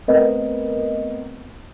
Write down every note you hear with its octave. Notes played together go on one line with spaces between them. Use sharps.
A3 B3 C4 A#4 B4 D#5